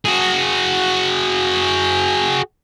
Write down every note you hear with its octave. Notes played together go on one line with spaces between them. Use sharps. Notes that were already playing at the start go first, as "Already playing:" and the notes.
F#4 G#4